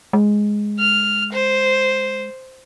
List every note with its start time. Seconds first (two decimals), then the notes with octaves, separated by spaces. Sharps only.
0.13 G#3
0.79 F6
1.32 C5